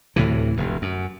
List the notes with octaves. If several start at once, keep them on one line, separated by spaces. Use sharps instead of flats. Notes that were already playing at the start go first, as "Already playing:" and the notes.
D2 A2 C3 E3
F1 D2
F#2